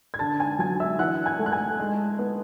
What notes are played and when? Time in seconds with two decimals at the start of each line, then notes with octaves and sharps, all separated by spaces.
0.14 G#6
0.19 D3 A5 A6
0.40 G#5 G#6
0.59 F#3 G#5 G#6
0.80 E5 E6
0.99 E3 F#5 F#6
1.26 G#5 G#6
1.39 A3
1.46 F#6
1.52 G#5 G#6
1.79 G#3
2.19 B3